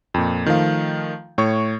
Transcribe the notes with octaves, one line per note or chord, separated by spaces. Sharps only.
F2 A#2
D#3 F3 A3 F5
A2 C#5 C#6